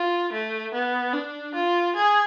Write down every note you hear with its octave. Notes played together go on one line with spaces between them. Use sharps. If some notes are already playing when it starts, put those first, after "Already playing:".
Already playing: F4
A3
B3
D4
F4
G#4